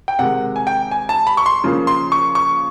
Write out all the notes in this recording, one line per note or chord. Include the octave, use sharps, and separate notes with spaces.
G5
C3 D#3 G#3 F#5
G#5
G5
G#5
A5
B5
C#6
C6
C#3 F3 A#3
C6
C#6
C#6